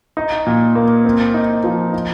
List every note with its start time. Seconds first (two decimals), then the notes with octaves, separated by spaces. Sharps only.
0.17 D#4
0.46 A#2
0.75 A#3
1.05 C4
1.34 D#4
1.64 F3
1.93 D#4